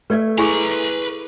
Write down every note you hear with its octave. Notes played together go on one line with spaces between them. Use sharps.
A3 B4 D5 E5
E4 G#4 B4 G#5 A#5 C#6 D6